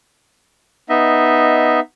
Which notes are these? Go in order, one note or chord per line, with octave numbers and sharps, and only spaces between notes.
B3 D#4 D#5 E5